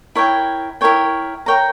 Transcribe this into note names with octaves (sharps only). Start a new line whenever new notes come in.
E4 A#4 C#5 G5
E4 A#4 C#5 G5
A#4 C#5 G5 A#5